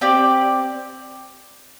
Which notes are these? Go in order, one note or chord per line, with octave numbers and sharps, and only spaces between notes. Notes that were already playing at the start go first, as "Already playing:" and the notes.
C4 G4 D5